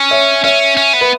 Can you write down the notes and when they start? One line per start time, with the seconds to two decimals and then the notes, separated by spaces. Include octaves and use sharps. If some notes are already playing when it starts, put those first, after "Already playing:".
Already playing: C#4
0.11 C#5 E5
0.44 C#4 C#5 E5
0.77 C#4
0.93 B3
1.01 B4